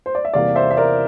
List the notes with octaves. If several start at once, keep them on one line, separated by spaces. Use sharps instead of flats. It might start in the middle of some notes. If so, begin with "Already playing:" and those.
C5
D5
E5
E2 C3 E3 G3 A#3 D5 F5
C5 E5
E5
A#4 D5